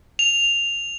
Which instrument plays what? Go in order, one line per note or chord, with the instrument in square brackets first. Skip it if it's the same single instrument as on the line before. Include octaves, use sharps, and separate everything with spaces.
[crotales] F7